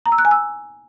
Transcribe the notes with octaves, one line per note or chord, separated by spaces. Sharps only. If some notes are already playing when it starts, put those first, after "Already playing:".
A#5
E6
F#6
G#5
E6